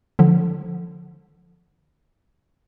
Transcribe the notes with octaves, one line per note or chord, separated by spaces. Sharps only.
D3 F3